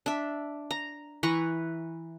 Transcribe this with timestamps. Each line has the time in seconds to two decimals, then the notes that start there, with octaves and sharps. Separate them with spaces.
0.06 D4 E5
0.71 A#5
1.23 E3 B4 A#5 C#6